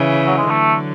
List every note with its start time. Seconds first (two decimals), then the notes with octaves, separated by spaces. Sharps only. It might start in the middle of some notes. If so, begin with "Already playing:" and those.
Already playing: C#3 E3
0.27 F#3
0.38 G#3
0.50 D3 F#3 A3